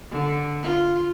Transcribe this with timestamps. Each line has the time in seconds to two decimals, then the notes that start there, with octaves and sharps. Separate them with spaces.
0.11 D3
0.62 F4